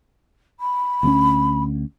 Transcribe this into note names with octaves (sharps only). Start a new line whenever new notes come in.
B5
D2 A#3 C#4